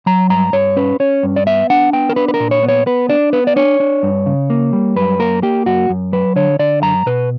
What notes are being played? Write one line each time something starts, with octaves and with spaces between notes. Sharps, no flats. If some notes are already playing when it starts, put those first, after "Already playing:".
F#3 A#5
G2 A#5
G2 C#5
C#4 B4
C#4 C#5
G2
D5
B3 E5
D4 F#5
B3 G5
A#4
D4 B4
B4
A#4
A#2
C#5
B3
C#5
B3 B4
D4 D5
B3 B4
D5
D4 C#5
D4
G2
C#3
A#3
G3
F#2 B4
A#3 A#4
A#3 G4
F#2 F#4
F#2
F#3 B4
D3 C#5
D3 D5
F#2 A#5
B2 B4